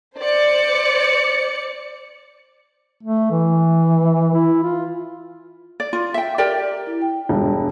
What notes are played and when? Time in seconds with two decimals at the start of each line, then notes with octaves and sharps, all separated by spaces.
0.19 C5 D5 C#7
3.03 A3
3.31 E3
4.34 E4
4.63 F4
5.80 D5
5.93 F4
6.14 E5 G5
6.38 G4 A#4 D5
6.87 E4
7.02 G5
7.29 E1 G2